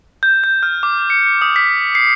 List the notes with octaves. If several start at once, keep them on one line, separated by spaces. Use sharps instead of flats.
G6
G6
F6
D6
C#7
D#6
B6
C7